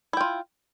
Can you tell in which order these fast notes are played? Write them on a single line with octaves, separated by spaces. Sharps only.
E4 G5 F4